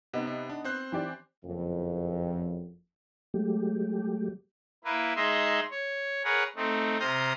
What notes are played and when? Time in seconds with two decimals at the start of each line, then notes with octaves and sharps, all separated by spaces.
0.14 C3 B3 D#4
0.27 C3
0.49 D4
0.64 C4 C5 F#6
0.92 E3 G4 D5
1.44 F#1 F2
3.34 F#3 G#3 A3 G4
4.85 A#3 E4 B4
5.16 G#3 D#4 D#5 E5 C6
5.71 C#5
6.24 G#4 A#4 B4 C#5 F#5
6.56 A3 C4 D#4
7.00 C3 C5 A#5 D#6 F6 G6